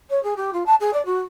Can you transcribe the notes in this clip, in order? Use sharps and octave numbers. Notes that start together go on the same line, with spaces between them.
C#5
G#4
G4
F4
A5
G#4
D5
F#4